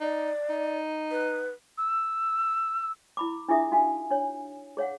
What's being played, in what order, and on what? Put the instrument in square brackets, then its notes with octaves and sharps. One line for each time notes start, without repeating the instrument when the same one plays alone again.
[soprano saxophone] D#4 [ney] D5
[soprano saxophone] D#4
[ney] B4
[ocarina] E6
[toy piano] E4 B5 D6
D4 E4 F4 G#4 E5 D#6
D#4 F#4 F5 G#5
D4 C#5
G#4 C#5 F5 F#5